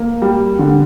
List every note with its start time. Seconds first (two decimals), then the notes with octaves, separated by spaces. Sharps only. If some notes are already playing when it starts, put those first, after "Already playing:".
Already playing: A#3
0.22 G3
0.59 D3